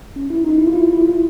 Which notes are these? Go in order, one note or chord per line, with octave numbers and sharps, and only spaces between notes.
C#4
E4
D#4
E4
F4
E4
F4
E4
F4
E4